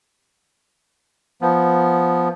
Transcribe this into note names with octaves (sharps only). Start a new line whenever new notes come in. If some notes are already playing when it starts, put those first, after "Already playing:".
F3 B3